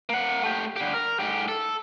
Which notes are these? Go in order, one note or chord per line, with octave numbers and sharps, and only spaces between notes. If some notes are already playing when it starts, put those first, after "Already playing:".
A#3 F#5
A3 G4
D3 G4
A#4
G#2 G4
A4